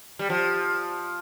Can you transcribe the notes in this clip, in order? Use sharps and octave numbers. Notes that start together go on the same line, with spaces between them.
G3
F3